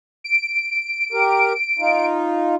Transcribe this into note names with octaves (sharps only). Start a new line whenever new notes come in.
D7
G4 A#4
D#4 F4